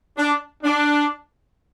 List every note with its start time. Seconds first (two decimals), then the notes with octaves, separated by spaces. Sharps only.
0.17 D4
0.63 D4